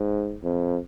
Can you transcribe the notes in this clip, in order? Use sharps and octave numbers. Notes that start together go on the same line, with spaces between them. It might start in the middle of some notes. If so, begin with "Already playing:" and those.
Already playing: G#2
F2